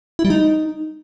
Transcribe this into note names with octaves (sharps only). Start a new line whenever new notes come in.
E4
G3
D#4